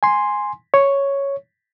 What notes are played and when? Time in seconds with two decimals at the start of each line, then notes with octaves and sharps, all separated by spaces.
0.03 G#5 C6
0.74 C#5